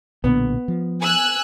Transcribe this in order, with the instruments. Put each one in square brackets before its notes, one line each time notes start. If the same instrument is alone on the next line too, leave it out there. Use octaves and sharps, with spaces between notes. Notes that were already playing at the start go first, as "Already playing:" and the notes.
[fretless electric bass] B1 A#2 D3 [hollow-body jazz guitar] B3
[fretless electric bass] F3
[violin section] G#5 E6 F#6